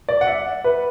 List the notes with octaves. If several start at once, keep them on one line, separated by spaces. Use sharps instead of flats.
D5
F#5
E5
B4